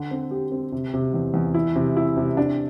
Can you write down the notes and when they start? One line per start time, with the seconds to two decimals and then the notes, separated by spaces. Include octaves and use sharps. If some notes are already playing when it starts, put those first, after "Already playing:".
Already playing: D3
0.11 C4
0.31 G4
0.52 C4
0.72 C3
0.94 C3
1.14 E2
1.34 E2
1.54 E4
1.75 C3
1.97 E4
2.17 C3
2.37 D4